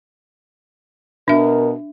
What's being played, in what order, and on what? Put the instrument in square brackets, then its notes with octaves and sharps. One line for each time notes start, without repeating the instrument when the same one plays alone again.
[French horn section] B2 A#4 [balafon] D4 E5